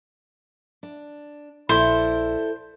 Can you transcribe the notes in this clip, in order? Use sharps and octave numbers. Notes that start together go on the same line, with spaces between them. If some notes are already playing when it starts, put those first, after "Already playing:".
D4
A#1 E4 A4 C5 D5